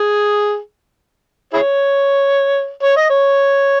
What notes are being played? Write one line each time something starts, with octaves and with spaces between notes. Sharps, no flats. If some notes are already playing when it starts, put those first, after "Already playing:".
Already playing: G#4
E4 G#4 C#5
C#5
D#5
C#5